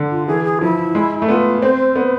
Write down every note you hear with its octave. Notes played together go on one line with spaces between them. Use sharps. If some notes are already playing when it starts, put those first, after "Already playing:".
Already playing: D3
F4
E3 G#4
G#4
F3 E4
G#3
A3
B3 F4
C4 C5
B3